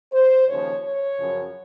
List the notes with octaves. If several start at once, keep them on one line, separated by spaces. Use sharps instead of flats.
C5
D#2 C#3 F3 C#5
C#5
F#2 C#3 F3